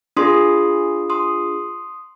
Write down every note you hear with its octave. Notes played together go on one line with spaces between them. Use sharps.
D4 F4 G#4 C6 D#6
C6 D#6